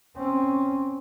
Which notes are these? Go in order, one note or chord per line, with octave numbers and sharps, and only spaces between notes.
C4 C#4